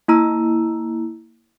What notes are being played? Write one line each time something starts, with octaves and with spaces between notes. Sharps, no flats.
A#3 E4 A#5 E6